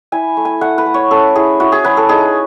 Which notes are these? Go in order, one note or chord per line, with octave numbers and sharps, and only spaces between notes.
E4 G#5
A3
G#5
A3 F#5
B4
A3
C#5
C#4 A4
E4 G#4
E4 F#4
G#4
F#3 B4
A4
D#4 G#4